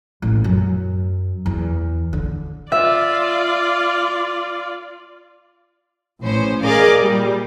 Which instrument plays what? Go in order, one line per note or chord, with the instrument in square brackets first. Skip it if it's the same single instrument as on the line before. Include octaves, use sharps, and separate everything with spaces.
[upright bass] A1
F#2
E2
D3
[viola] F4 D5 [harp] E5
[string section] A1 C#4 C5
G#4 A#4 D5 D#5 F5 D6
A#2 G3